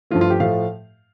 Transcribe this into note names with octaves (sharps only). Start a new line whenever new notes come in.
G2 F3 A3 F4
F4
G4
A2 F3 A3 F5